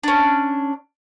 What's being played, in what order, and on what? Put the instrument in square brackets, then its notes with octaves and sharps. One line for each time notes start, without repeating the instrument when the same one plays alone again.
[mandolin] C#4 D4